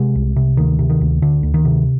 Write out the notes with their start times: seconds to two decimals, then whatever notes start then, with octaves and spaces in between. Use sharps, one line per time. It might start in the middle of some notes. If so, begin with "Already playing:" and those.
Already playing: C3 G#3
0.15 C2
0.36 C3
0.57 D2 D#3
0.79 C3
0.90 D#3
1.01 D2
1.22 D2 D3
1.43 D2
1.54 D#3
1.65 C3